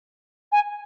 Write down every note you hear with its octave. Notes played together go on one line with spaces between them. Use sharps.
G#5